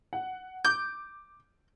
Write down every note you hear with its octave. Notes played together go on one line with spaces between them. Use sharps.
F#5
D6 G6